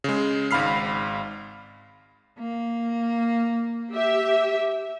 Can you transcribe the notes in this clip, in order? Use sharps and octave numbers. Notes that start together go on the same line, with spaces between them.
C#3 G#3
G#1 G#2 F5 B5 F6 C7
A#3
G4 E5